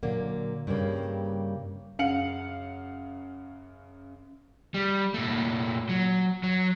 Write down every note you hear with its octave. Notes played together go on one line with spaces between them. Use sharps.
A#2 D3 F#3 A#3
G2 C#3 G3 A#3
F#2 C#3 F5 F#5 C#7 F#7
G3
A#2 A3
F#3
F#3